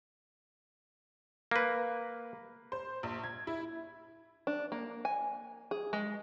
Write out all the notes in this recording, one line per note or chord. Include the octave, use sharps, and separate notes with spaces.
A#3 B4
C5
A#1
G#6
E4
D4
A#3
G#5
G#4
G#3